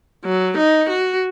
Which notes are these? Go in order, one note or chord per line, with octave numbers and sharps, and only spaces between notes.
F#3
D#4
F#4